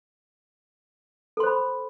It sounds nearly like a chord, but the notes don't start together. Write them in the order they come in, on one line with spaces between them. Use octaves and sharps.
A4 C6 C5 B5